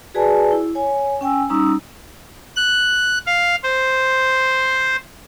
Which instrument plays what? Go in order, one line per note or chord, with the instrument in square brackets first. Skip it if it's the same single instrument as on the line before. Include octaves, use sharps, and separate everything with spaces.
[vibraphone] F#4 G#4 B4 D5 G#5 A5
E4
C#5 G#5
C#4 G5 G#5 E6
G3 C#4 D#4 A#5 D#6 E6
[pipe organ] F#6
F5
C5